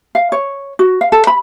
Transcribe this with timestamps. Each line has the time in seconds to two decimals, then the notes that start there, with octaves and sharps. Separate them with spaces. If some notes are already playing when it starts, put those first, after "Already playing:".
0.15 F5
0.32 C#5
0.79 F#4
1.01 F5
1.12 A4
1.27 B5